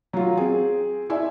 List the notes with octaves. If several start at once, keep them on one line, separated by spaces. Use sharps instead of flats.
F#3 F4
C4 G#4
E4 D5 E5 G#5